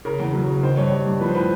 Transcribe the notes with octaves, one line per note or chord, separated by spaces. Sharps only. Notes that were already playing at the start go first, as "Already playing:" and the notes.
C#3 A#4
E2
F#3
C#3
D#3 C5
G2 C#5
G3
G2
F3 B4
C5
A2 B4